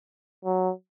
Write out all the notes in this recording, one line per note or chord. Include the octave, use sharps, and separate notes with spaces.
F#3